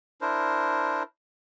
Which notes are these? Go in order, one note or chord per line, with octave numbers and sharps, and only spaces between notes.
D4 E4 A#4 C5